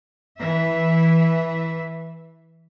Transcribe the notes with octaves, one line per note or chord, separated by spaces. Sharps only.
E3 E5